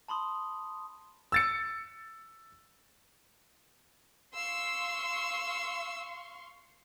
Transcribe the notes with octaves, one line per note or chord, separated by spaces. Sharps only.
A5 B5 C6 D#6
E6 A6 C#7
F5 C6 C#6 E6